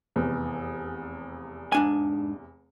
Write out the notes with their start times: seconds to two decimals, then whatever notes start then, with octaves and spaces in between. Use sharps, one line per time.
0.16 F1 E2
1.72 G#2 D4 G#5